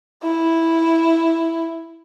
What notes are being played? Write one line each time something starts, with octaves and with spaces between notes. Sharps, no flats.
E4